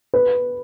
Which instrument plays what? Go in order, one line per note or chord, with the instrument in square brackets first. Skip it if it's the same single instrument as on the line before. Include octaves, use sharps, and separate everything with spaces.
[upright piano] B4